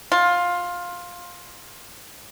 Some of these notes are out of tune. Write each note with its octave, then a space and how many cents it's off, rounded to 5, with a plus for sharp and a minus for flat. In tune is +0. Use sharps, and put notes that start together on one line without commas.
F4 +15